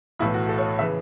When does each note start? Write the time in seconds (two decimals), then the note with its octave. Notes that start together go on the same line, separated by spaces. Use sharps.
0.19 B1 A2 E3 E4
0.34 F#4
0.49 A4
0.58 C#5
0.79 C#3 E3 E5